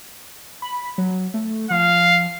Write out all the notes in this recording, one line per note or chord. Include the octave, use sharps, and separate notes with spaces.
B5
F#3
A3
F3 F5